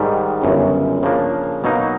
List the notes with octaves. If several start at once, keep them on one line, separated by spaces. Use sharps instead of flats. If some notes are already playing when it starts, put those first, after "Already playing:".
Already playing: G#2 D#3 G3
G1 F#2 C#3
C#3 F3 A#3 D4
B2 F#3 A#3 D#4